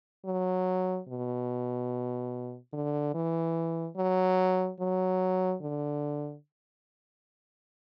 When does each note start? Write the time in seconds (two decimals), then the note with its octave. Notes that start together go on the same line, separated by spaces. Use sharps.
0.25 F#3
1.08 B2
2.73 D3
3.14 E3
3.96 F#3
4.80 F#3
5.61 D3